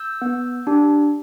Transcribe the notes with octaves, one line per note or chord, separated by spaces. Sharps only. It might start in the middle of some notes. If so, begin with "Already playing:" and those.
Already playing: E6 G6
B3
D4 G4